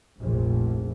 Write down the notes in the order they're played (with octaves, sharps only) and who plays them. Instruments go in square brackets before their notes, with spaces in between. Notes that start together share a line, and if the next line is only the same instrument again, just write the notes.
[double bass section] F1 A#1